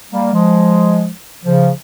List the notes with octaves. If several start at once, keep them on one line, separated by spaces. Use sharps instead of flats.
G3 A#3
F3 G#3
C#3 F3